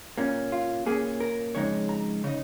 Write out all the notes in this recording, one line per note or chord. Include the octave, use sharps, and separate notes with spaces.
A#2 A#3 C#4
F4
A#2 A#3 C#4 G#4
A#4
F2 C#3 G#3 D#4 C#5
A#5
C#3 D#4